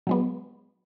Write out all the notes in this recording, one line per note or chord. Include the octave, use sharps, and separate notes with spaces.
F#3 G#3 B3